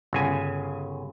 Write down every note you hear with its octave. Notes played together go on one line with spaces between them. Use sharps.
G1 C#3 G#5